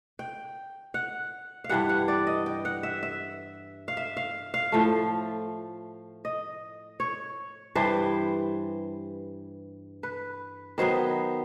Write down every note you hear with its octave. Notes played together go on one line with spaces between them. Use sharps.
G5
F#5
F5
G2 E3 G3 F#5
F#5
D5
D#5
G5
F#5
E5
E5
F5
E5
F5
F5
A2 F3 A3
D#5
C#5
G2 E3 G3 C5
B4
D#3 F#3 B3 C5